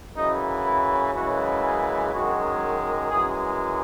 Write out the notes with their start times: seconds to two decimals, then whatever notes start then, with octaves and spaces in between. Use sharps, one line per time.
0.15 F#2 C#3 E3 D#4
0.65 E4
1.14 F#2 C#3 E3 G#3 F#4
1.63 G#4
2.12 F#2 D#3 G#3 F#4
3.10 F#2 E3 G#3 G#4